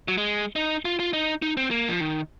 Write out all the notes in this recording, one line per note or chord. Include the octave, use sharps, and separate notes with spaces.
F#3
G#3
D#4
F4
F4
D#4
D#4
C4
A#3
F3
D#3